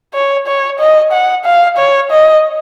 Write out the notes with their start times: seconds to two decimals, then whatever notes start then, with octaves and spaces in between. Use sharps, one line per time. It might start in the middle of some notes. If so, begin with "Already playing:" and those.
0.14 C#5
0.47 C#5
0.79 D#5
1.12 F#5
1.45 F5
1.77 C#5
2.10 D#5